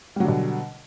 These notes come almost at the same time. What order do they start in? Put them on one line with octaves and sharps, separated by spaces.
G3 F#3 D3 B2